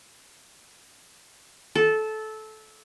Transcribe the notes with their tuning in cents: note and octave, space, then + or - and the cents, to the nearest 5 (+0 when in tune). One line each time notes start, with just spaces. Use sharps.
A4 -15